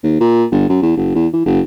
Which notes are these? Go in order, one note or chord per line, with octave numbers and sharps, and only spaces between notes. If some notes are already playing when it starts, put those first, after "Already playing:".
D#2
A#2
G1
F#2
E2
F#1
E2
E3
F#1